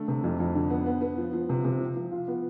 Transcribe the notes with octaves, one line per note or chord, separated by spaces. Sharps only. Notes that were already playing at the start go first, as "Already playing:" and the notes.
Already playing: D3 A3
C3
F2
F2
D3
B3
B3
B3
F3
F3
C3
C3
F3
F3
F4
B3